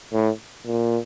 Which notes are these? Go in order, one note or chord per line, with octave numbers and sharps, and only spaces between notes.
A2
A#2